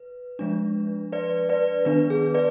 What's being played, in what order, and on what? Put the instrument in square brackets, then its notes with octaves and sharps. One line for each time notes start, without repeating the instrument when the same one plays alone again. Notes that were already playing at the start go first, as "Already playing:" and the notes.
Already playing: [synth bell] B4
F3 G#3 D4
B4 D5
B4 D5
D#3 B3 D4 B4
G#4
B4 D5